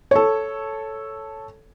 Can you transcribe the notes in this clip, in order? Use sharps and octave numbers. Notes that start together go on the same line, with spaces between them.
A4 C#5